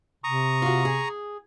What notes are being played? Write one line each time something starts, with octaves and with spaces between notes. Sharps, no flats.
C3 A#5 C#6 D#6
F4 F#4
G#4